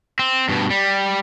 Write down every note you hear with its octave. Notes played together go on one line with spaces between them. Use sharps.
C4
G2 B2
G3